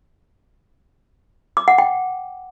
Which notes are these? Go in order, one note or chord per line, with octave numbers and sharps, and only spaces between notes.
D6
F#5
G5